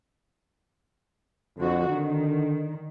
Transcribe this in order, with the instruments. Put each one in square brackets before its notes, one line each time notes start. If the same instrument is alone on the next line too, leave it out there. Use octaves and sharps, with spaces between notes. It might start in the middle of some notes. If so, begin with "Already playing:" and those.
[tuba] F2 [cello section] D3 F#4
[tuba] D3 [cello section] D#3